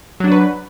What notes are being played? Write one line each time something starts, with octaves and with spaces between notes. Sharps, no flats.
F#3 D4 F#4 B4